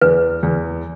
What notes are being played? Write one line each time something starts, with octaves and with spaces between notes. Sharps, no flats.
E2 B4
E2